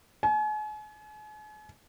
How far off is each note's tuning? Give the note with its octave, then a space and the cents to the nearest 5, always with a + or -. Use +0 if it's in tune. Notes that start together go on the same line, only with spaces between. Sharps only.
G#5 +40